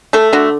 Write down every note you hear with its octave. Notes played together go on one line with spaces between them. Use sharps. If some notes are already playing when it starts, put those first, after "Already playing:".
A3 A4
D3 F#4